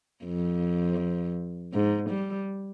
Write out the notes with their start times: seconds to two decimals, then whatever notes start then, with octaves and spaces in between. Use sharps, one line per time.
0.25 F2
1.73 G#2
2.10 G3